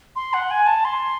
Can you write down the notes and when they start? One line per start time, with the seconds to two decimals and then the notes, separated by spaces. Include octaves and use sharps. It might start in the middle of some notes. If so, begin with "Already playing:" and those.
0.16 C6
0.34 F#5
0.51 G#5
0.67 A5
0.85 C6